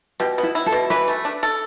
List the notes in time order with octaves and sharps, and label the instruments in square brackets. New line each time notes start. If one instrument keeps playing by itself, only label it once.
[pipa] B2 [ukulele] G4
[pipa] B3
[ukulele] E4
[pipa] E4
[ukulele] A4
[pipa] B2
[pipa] E3 [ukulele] B4
[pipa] A3
D4
A4